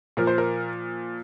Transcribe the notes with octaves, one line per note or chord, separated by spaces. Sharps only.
A#2 F3 A#4
C5
A#4